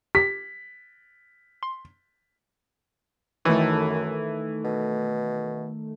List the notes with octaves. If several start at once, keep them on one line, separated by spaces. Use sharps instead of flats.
G4 B6
C6
F#2 D#3 E3 A3
B2